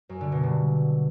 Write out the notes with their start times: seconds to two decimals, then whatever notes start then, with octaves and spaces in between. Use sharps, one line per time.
0.09 F#2
0.21 D3
0.32 B2
0.43 G2